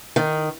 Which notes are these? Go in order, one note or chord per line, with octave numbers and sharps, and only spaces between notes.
D#3